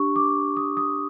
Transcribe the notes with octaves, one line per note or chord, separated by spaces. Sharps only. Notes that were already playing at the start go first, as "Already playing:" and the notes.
Already playing: D4 G4 C#6
D6
D#6
D#6